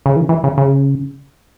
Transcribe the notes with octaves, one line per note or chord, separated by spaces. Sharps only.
C#3
E3
E3
C#3
C#3